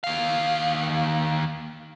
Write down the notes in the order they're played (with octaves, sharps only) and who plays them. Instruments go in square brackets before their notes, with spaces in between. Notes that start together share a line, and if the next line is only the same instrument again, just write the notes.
[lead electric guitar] D#2 F5